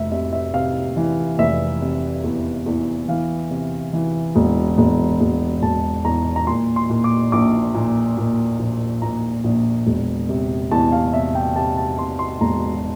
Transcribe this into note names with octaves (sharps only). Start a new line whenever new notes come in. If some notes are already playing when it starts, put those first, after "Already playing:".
Already playing: F1 E5
C3 E5
E5
C3 F5
E3
F1 E5
C3
E2
E2
E3 F5
C3
E3
E1
E1
E1
E1 A5
E2 A#5
A#5
A#2 C6
C6
A#2
D6
A#1 D6
A#2
A#2
A#1
A#2 A#5
A#1
E1
C3
E2 A5
F5
C3 E5
G5
C3 A5
A5
C3 C6
C6
E1 A#5